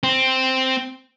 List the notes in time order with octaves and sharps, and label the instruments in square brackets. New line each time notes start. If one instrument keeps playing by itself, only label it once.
[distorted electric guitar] C4